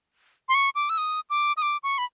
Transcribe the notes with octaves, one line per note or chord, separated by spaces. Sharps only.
C6
C#6
D6
E6
D#6
D6
D#6
D6
C#6
B5